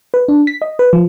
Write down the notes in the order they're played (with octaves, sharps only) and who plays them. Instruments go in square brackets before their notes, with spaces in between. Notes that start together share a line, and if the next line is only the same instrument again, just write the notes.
[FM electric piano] B4
D4
B6
D#5
B4
F3